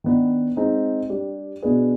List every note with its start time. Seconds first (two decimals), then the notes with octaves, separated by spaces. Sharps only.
0.04 D#3 B3 D4
0.56 G#3 C4 D#4
1.09 G3 D4 G4
1.62 B2 B3 D4 G#4 B4